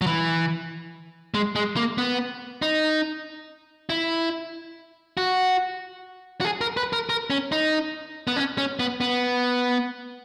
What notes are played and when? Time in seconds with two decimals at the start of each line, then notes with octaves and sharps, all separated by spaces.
0.01 F#3
0.07 E3
1.34 G#3
1.55 G#3
1.76 A#3
1.98 B3
2.62 D#4
3.89 E4
5.17 F#4
6.41 F#4
6.45 G#4
6.61 A#4
6.77 B4
6.93 A#4
7.09 A#4
7.30 C#4
7.52 D#4
8.27 B3
8.36 C#4
8.58 C#4
8.79 B3
9.01 B3